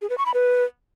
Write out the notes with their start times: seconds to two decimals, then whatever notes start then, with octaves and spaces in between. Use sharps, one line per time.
0.02 G#4
0.10 B4
0.18 C#6
0.26 B5
0.34 B4